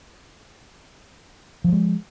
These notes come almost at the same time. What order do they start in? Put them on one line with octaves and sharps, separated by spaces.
F3 F#3 G#3